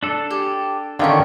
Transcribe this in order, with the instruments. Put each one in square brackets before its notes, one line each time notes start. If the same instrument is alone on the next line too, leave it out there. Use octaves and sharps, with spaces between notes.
[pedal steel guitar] D4 A4
[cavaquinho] G4 G#5
[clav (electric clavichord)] D3 D#3 C#4 [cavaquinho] F4 G5 C#6